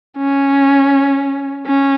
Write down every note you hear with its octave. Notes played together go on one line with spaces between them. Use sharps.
C#4
C#4